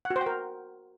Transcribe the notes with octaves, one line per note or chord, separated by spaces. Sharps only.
F#5
F#4
C5
G5
A#4